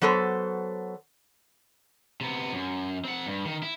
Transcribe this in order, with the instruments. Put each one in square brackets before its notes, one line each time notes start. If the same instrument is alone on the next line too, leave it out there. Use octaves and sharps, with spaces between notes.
[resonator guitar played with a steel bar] F#3 B3 A4 C5
[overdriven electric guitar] C3 B3
F#2
C4 F#5
G2
D#3
E4